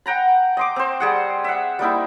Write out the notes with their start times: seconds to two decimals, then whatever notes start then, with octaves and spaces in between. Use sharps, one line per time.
0.06 F#5 G5 A#5 B5
0.57 D#5 C6 D6
0.76 C4 C5
1.00 G3 G#4 F#5
1.44 E5 F#5
1.79 G3 A#3 D#4 E4